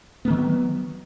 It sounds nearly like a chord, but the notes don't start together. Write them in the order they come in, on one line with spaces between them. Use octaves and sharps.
B3 A#3 D#3 F#3